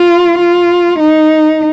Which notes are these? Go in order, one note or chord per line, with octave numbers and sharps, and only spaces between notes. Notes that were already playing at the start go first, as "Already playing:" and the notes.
Already playing: F4
F4
D#4